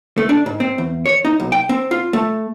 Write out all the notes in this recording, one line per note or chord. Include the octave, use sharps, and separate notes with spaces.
A3
D4
G#2
C4
E2
C#5
D#4
B1
G5
C4
F4
A3